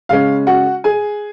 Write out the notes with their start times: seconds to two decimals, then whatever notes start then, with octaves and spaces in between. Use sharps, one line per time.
0.09 C#3 G#3 C#4 F5
0.47 F#4 F#5
0.84 G#4 G#5